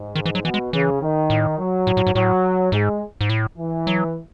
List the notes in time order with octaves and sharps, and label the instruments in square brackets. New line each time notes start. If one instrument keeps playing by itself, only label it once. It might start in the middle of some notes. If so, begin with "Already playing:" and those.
Already playing: [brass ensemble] G#2
[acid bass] D#3
E3
F#3
[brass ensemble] B2 [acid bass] E3
[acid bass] G#3
[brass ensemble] C#3 [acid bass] E3
[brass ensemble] D#3
[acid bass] A2
[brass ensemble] F#3
[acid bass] A2
A2
G#2
[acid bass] A2 [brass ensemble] F#3
[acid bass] G#2 [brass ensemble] G#3
[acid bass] G#2
A2
[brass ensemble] E3
[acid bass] F#3